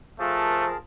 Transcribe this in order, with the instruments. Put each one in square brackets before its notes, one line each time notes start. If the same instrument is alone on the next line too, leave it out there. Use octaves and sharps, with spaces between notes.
[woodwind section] F3 A#4 [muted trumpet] A3 [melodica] G#4 A5